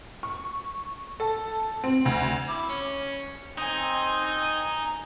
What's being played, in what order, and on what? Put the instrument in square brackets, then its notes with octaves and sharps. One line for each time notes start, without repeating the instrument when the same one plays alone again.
[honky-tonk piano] C#6
A4
C4
D2
[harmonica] E4 D6
C#4
[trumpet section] C4 [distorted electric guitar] D#4 [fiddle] G#5 [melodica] D#6